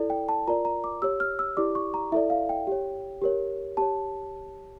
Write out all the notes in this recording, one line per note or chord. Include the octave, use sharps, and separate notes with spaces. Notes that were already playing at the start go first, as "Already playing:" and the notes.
Already playing: E4 A4 D5
G5
A5
F4 A#4 D5 A#5
A#5
D6
G4 C#5 E6
F6
E6
E4 G4 D5 D6
C#6
A#5
E4 A4 D5 E5
F5
G5
G4 C#5
G4 A#4 C#5
G4 C#5 A5